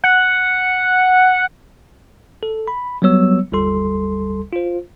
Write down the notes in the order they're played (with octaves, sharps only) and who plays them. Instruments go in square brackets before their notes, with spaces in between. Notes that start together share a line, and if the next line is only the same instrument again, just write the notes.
[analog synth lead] F#5
[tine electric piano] A4
B5
F#3 G3 B3 C#5 E6
G1 D#2 G3 A4 C6
F4 C5